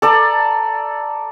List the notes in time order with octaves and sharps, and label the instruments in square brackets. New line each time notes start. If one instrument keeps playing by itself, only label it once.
[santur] A4 D5 A#5